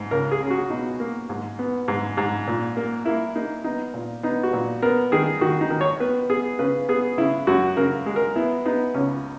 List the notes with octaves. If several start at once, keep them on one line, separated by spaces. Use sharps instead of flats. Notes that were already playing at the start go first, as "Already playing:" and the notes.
Already playing: G#2
C#2 A#4
G#4
C#4
F#4
B2 D#4
A#3
G#2
B3
G#2
G#2
A#2
A#3
A#3 E4
A#3 D#4
B3 D#4
A#2
B3 D#4
F#4
A#2
B3 A#4
D#3 G#4
D#3 F#4
D#4
D#3
C#5
B3 B4
B3 G#4
C#3 B4
B3 G#4
C#3 E4
F#2 F#4
C#3 A#4
G#3
A#4
B3 E4
B3 D#4
C#2 C#4